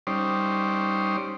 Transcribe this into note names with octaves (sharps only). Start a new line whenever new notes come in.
G3 C#4 D#4 C5 D5